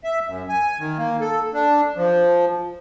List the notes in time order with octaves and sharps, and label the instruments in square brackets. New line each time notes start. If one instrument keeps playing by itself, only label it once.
[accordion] E5
F#2
G#5
D#3
A#3
A4
D4
F3